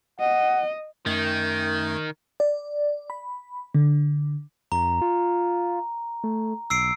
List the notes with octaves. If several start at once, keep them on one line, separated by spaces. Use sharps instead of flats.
D#5 F#5
F#2 D#3 A3 G#6
D5
B5
D3
F2 A#5
F4
A3
B1 E6 C7 D7